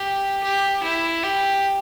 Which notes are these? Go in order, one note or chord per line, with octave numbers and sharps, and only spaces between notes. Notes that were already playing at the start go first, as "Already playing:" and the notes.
Already playing: G4
G4
E4
G4